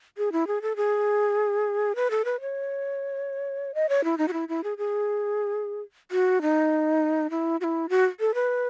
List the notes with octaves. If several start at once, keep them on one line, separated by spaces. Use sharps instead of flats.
G#4
E4
G#4
A4
G#4
B4
A4
B4
C#5
D#5
C#5
E4
D#4
F#4
E4
E4
G#4
G#4
F#4
D#4
E4
F#4
E4
F#4
A4
B4